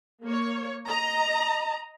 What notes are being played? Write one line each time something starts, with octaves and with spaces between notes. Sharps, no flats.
A#3 C#5
D#5 A#5